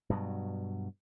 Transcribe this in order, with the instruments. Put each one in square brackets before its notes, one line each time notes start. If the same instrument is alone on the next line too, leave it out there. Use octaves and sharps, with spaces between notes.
[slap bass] G2 B2 F#3